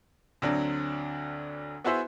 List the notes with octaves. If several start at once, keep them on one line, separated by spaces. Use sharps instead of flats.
D2 D3 F#3 C4 D4
B3 E4 F#4 G#4 C5 E5